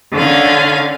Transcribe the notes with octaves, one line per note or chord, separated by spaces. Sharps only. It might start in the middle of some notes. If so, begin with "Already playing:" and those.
D3 D#3 C#4 F5